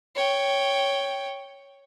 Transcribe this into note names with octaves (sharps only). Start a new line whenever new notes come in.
C#5 G5